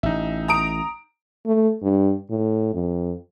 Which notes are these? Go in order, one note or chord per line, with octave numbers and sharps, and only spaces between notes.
A1 D#4 E5
A#5 D#6 D7
A3
G2
A2
F2